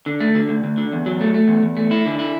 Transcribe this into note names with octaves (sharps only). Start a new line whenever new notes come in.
D3
A3
D3
D2
D2
D3
E2
F#3
A3
A3
E2
E2
A3
E4
D3
E4